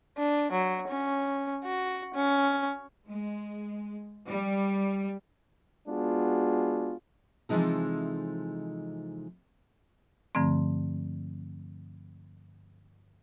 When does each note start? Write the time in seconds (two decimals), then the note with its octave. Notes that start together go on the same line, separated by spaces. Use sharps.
0.18 D4
0.52 F#3
0.88 C#4
1.64 F#4
2.14 C#4
3.10 G#3
4.29 G3
5.87 G#3 B3 D4 F4 F#4 G#4
7.49 C3 E3 F3 G#3 D#4 A4
10.35 G2 D3 F3 A3 C4